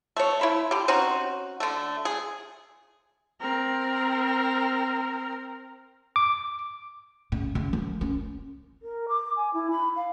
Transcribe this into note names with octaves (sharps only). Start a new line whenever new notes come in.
A3 C#5
E4 B5
D3 G4
C4 C#4 D#4 F#4
D3 A3
G#4
C4 A#4
D6
C#3
C#3
F3
C#4
A#4
D6
G#5
E4
B5
F5